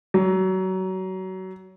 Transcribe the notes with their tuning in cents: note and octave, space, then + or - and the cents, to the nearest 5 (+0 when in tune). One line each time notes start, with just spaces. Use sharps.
F#3 +25